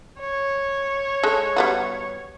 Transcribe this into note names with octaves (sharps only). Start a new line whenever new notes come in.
C#5
G#3 A4
G3 B3 F#4